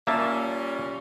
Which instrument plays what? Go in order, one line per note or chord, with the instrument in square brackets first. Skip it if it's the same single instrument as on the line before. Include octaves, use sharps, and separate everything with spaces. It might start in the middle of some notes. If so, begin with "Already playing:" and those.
[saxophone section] A#2 G3 C#4 [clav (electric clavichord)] A#3 E5 A5